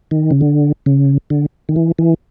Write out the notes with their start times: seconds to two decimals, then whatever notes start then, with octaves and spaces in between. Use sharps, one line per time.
0.11 D#3
0.31 C#3
0.41 D3
0.86 C#3
1.30 D3
1.69 D#3
1.76 E3
1.99 E3